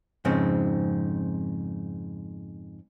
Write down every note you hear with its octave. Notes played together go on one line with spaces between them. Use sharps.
F2 G#2 C#3 C4